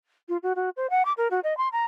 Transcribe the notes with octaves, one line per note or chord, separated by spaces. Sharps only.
F4
F#4
F#4
C5
F#5
D6
A#4
F#4
D#5
C6
A#5